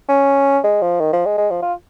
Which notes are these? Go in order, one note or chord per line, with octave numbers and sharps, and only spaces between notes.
C#4
G#3
F3
D#3
F3
G#3
G#3
F3
F4